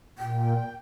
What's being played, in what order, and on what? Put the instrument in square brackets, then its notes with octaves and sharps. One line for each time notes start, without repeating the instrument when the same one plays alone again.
[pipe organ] A#2 [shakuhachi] G5